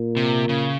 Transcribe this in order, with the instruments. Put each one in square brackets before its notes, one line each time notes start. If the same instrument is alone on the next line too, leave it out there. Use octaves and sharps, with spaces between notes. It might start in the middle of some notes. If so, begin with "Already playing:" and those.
Already playing: [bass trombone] A#2
[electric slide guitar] C3
C#3